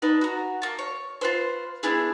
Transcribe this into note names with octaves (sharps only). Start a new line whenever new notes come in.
D4 D#4 B4
F#4 A#5
A#3 A5
C#5
F4 B4 C5
B3 D4 E4 G#4